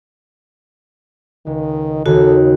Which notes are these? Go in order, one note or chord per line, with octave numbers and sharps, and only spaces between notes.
C#2 D#3
D#2 C#3 F#4 A4